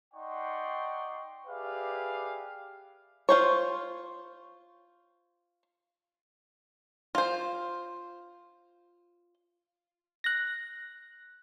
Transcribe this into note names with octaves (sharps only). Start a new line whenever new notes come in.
D#4 D5 F#5 G5 C6 C#6
G4 G#4 B4 D5 E5 F5
F4 C5 C#5
F4 C5
F#6 A#6